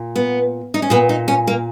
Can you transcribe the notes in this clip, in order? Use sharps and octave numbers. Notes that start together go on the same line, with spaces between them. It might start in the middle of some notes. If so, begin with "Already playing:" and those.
Already playing: A#2
B3
D#4
C#4
A#2 B3
D#4
C#4
A#3